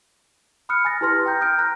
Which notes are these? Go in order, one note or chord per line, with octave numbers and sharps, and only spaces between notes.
B5 D#6 F6 F#6 C#7
G#5 D#6 A6 A#6
E4 G4 B4 C6 F6 A#6
G5 A#5 G6
D#6 F6 G6 D7
A#5 F6 F#6 A#6